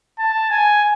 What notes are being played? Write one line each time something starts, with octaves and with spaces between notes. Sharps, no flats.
A5
G#5